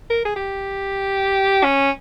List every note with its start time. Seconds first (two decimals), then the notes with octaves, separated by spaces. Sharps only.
0.10 A#4
0.25 G#4
0.36 G4
1.64 C#4